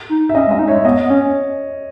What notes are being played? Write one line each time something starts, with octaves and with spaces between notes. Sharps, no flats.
D#4
E5
C#4 D#5
G#3
C#4 D#5
D#4
G#3 C#5 E5
B3 D#5
B3
C#4 C#5